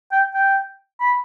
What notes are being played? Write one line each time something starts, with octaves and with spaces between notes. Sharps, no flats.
G5
G5
B5